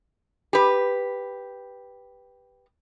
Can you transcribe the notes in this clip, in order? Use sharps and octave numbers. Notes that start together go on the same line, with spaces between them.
G4 B4